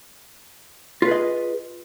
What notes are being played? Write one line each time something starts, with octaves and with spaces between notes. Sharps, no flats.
F4 G#4 B4 D#5